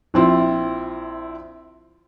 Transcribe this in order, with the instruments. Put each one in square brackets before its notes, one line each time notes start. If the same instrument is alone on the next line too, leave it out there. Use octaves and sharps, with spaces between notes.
[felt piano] A#1 C4 E4 F4